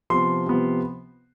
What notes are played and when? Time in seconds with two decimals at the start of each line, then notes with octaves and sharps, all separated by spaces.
0.10 C3 F3 B3 C6
0.46 C3 F3 B3